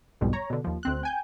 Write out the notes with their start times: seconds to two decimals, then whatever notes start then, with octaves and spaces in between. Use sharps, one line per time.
0.21 B1 F2 G#2 B2 G3
0.33 C#5 A#5
0.50 B2 D3
0.64 D#2 F3
0.83 D2 C4 F#6
1.03 G5 G#5 G6